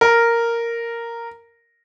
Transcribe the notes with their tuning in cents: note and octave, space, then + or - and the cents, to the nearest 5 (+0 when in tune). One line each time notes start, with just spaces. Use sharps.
A#4 -5